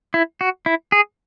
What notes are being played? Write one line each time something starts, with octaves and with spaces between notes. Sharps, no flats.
E4
F#4
E4
G#4